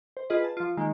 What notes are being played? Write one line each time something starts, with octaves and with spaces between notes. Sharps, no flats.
C5
F4 G#4 B4 D#5
A5
F3 F4
D#3 G#3 A#3 D#4